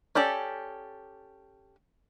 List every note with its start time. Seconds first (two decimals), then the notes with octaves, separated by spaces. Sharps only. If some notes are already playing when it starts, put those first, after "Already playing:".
0.15 C#4 G4 A4 D5